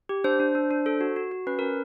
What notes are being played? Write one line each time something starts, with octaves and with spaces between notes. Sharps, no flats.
G4
D4 C5
D4
D4
D4
A4
F#4
F#4
F#4
C#4 B4
C#4 A#4